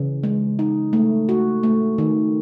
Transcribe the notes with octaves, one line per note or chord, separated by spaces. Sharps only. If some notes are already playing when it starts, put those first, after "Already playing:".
Already playing: C#3 E3
G#3
D#4
A3
F#4
A3
D#3